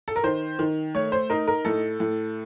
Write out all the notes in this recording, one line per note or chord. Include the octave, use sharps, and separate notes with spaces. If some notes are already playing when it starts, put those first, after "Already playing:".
A4
A#4
D#3 C5
D#3
A3 C#5
C5
D#4 A#4
A#4
A2 A4
A2